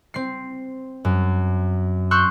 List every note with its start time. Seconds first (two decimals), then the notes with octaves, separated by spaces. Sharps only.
0.14 C4 C7
1.05 F#2
2.11 C6 C#6 E6 F#6 G6